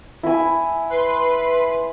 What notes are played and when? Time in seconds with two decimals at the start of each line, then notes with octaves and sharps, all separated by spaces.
0.23 E4 G#5
0.90 B4 C6